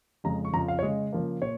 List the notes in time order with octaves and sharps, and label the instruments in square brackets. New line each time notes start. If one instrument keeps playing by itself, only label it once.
[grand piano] F2 C#3 G#3 A#5
C#6
F2 C#3 F3 A#5
F5
C#5
C#3 G#3 D#5
C#3 F3 A#3
A#2 C#5